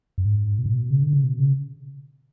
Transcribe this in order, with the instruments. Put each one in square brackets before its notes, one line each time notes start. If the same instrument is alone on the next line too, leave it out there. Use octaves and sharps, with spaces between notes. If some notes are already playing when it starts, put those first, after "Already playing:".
[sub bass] F#2
G#2
B2
A2
B2
C#3
D3
C#3
B2
C#3